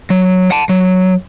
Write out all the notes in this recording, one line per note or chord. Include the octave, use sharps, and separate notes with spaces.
F#3
F#5 A5
F#3